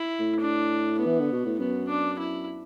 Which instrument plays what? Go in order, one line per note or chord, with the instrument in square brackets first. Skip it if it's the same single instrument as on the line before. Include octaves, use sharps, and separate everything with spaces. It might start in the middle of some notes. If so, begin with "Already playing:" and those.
Already playing: [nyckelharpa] E4
[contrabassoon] A2
[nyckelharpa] D4
B3
[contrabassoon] E3
D3
B2
A2
[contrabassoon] F#2 [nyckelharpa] B3
[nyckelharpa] D4
E4